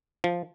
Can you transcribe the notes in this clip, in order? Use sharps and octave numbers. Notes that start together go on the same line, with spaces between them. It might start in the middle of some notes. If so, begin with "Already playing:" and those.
F3